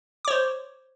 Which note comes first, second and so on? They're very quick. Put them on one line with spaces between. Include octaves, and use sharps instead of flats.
D6 C#5 C5